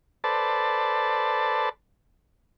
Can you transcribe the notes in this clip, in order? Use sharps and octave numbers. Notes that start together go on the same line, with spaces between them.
A4 B4 C5 D5 A5